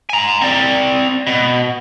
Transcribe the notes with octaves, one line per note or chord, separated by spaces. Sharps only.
G#5 A#5
C4 D5
B2